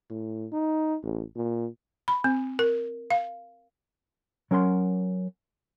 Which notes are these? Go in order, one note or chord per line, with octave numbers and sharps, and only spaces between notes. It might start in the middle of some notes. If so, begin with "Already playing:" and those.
A2
D#4
A1
A#2
B5
C4
A#4
F5
F#3 C#4 A#4 F#5 C6